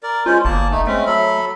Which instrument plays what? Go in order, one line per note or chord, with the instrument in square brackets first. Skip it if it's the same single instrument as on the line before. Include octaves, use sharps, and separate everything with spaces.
[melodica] A#4 D5
[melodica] G#3 C#4 C5 [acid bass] F4
[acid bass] G1 [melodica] A#3 D5 A5
[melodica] A3 D#4
[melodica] G#3 C4 C#4 [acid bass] A3
[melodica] F#3 A4 B5